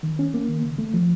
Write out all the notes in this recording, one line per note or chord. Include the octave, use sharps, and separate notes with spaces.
D#3
C#4
A#3
D#3
C#3
A3
F3